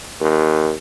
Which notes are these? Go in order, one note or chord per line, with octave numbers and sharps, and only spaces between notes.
D#2